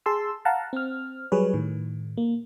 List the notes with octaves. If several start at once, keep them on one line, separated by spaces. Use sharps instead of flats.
G#4 A5 C6 E6
F5 F#5 A5 A#5
C4 F6
F#3 G3 G#4 B4 C#5
A2 D#3
A#3